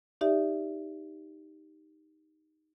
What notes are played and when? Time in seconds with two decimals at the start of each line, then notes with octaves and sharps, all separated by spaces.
0.21 D#4 G4 D5 E5